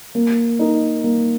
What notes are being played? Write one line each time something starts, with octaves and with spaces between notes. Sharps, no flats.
A#3
D#4 A#4
A#3